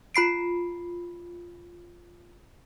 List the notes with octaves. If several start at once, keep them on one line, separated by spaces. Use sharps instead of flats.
F4 B5 C7 D7